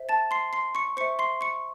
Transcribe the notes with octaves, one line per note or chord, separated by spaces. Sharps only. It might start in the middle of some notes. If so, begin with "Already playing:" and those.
Already playing: C5 E5
A5 A6
C6 C7
C6 C7
C#6 C#7
C5 E5 C#6 C#7
C6 C7
C#6 C#7